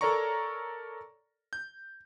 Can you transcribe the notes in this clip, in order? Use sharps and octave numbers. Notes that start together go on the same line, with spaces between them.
A4 A#4 C#5 D5 A#5 C#6
G6